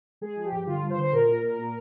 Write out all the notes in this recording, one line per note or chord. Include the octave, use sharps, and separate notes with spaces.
G#3 G#4
F3
G4
G2
D3 F4
G2
C5
D3
C5
A#2 A#4
A#2
A#2
A#2